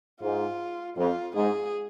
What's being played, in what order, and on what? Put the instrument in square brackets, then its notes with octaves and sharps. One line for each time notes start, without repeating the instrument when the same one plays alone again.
[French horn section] G#2 [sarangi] F4
[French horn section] F2 [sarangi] F4
[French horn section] G#2 [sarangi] G#4